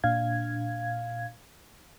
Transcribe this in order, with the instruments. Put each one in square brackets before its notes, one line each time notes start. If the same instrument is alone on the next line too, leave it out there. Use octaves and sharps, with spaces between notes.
[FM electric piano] A#2 D4 F5 G#6